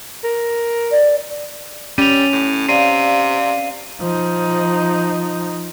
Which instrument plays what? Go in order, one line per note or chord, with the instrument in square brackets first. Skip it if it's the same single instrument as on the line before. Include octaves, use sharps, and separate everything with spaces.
[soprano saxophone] A#4
[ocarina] D5
[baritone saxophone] G3 [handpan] C#4 [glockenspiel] D#7 F7
[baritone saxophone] A2
[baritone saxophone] C3 [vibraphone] D5 F5 [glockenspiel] C7 D#7
[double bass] F3 D#4